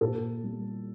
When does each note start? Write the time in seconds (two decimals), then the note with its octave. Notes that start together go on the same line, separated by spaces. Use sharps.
0.01 A#2 A4
0.44 G3